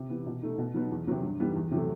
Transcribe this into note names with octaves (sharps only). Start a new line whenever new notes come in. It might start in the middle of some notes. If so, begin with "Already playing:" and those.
Already playing: C3
E3 B3
B2
A3 D#4
B2
F#3 B3 D#4
E2
C3 F#3 B3
G2
E3 G3 B3 D#4
E2
C3 F#3 A3